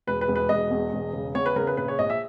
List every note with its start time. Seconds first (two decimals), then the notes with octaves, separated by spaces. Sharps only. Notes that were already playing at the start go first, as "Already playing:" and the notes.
0.07 E1 B4
0.21 B4
0.28 E1
0.36 B4
0.49 E1 D#5
0.71 E2
0.93 E1
1.14 C#3
1.35 E2 C#5
1.46 B4
1.56 C#3 A#4
1.67 B4
1.77 A#1 B4
1.88 C#5
1.99 A#1 D#5
2.10 E5